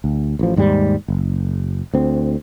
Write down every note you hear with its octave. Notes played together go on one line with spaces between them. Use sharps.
D2
A1 F3
D#2 G#2 F#3 G3
F#1
D2 C4